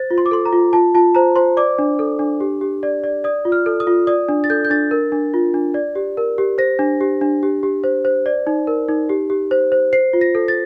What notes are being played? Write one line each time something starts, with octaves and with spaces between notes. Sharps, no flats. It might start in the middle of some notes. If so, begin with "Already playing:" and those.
Already playing: C5 A6
F4
C6
D6
A4 C6
A#5
F4
F4 A5
F4 A5
C5 A#5
C5 C6
D5 D6
D4
A4
D4
G4
G4
D5
D5
D5 D#6
F4
F6
A4
D#6
F4
D5 D#6
D4
A6
A4 G6
G6
D4 A6
A#4
D4
F4
D4
D5
G4
A#4
G4
C5 A#6
D4
G4
D4
G4
G4
C5
C5
D5
D#4
A#4
D#4
G4
G4
C5
C5
C5 C7
F4
A#6
A4
A6